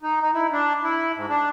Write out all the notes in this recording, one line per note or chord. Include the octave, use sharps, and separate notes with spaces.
D#4
D#4
E4
D4
E4
G#2
D4